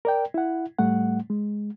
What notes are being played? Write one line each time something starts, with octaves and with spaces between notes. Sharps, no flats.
A#4 D5 G5
E4 F#5
A2 G3 A3 F#5
G#3